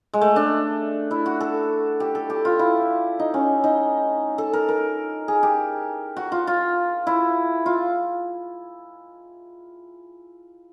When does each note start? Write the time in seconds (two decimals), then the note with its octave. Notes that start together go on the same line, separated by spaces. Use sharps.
0.13 G#3
0.21 A3
0.36 D4
1.11 E4
1.26 F#4
1.41 A4
2.00 G4
2.15 A4
2.30 G4
2.45 F4
2.59 E4
3.19 D#4
3.34 C#4
3.64 D#4
4.38 A4
4.53 A#4
4.69 A#4
5.28 G#4
5.43 G4
6.16 F#4
6.32 F4
6.47 F4
7.07 E4
7.66 F4